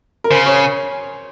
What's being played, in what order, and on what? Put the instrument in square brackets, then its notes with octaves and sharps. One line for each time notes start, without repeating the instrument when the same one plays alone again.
[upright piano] A#4
[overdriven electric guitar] C#3 [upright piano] C5
[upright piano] C#5